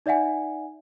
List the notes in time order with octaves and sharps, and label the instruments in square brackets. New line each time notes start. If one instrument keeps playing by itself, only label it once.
[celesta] D#4 D5 E5 F#5 G#5